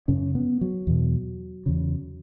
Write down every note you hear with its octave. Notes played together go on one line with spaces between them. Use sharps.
F#2 C#3 C#4
B3
F#3
E2 B2
E2 C#3